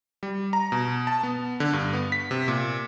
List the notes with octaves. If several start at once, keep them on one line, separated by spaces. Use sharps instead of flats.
G3
A#5
B2
A5
B3
D3
G2
B3
B6
C3
A#2